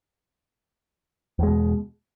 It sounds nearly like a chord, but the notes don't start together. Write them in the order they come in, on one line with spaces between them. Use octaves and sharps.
E2 G#3 B2